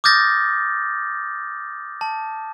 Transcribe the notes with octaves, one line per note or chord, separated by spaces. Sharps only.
D6 D#6 F6 G6 A6 A#6
A5